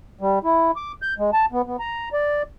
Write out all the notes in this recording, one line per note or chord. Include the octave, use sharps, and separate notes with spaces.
G3
E4
D6
G6
G#3
A5
B3
B3
A#5
D5